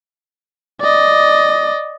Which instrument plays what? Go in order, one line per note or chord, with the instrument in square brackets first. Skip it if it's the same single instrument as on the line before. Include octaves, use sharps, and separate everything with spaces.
[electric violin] D5 D#5